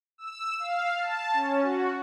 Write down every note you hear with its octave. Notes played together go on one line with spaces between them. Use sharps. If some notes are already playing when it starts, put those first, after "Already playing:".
E6
F5
A5
C#4
F#4